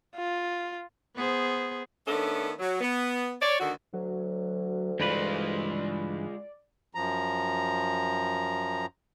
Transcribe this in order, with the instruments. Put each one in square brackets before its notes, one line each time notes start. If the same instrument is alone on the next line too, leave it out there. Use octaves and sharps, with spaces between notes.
[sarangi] F4
[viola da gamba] B3 G#4 C5
[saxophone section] D#3 A3 B3 C#4 D4 A4
F#3
B3
C#5 D5
D2 D3 D#3 F#4
[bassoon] D2 [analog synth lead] F#3
[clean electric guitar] G2 E3 B4 [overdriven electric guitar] G#3 F4 [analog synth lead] D5
[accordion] F#2 F3 A#5